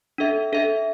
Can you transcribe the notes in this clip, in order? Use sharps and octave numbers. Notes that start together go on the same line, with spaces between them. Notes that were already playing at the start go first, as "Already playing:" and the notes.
D4 A4 E5
D4 A4 E5